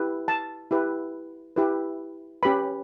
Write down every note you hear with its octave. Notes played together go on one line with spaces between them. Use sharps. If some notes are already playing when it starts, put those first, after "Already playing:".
Already playing: E4 G4 B4
A5
E4 G4 B4
E4 G4 B4
C#4 G4 B4 B5